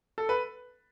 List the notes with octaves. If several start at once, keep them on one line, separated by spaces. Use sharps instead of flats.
A4
B4